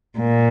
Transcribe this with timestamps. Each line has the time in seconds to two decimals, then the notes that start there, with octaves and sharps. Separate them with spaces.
0.19 A#2